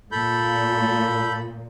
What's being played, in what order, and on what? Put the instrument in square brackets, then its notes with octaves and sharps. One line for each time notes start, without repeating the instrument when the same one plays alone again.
[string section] A#2 [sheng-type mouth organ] A4 B5 G6